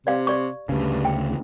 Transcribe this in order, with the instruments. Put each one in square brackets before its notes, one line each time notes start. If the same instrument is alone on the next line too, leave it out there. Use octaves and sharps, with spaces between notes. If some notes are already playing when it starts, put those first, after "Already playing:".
[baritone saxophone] C3 [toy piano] D5 F5
[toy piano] G4 D5 C#6
[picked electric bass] D2 C#3 [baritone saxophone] G2
[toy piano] G5
[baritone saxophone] E2